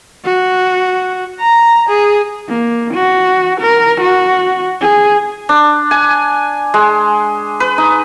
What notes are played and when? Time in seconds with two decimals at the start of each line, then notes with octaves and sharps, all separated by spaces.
0.25 F#4
1.40 A#5
1.89 G#4
2.49 A#3
2.94 F#4
3.61 A#4
4.01 F#4
4.81 G#4
5.49 D4
5.91 G#5
6.74 G#3
7.60 B4
7.78 D#4